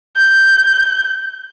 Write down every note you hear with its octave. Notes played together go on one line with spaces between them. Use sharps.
G6